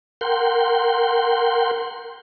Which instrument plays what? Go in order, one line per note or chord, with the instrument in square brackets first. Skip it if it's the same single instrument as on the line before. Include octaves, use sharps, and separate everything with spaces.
[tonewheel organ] A#4 F#5 G5 C6